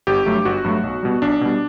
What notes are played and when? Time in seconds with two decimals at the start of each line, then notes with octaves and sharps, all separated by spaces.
0.07 G1 G4
0.26 G2 F#3 A3
0.45 G1 F#4
0.65 G2 F#3 A3
0.84 B1
1.03 B2 G3
1.22 B1 D4
1.41 B2 G3